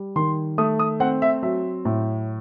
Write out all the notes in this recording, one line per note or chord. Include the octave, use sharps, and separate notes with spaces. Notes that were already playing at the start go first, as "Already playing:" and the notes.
Already playing: G3
D#3 C6
A3 D#6
D#6
C4 F#5
E5
F#3 E5
A2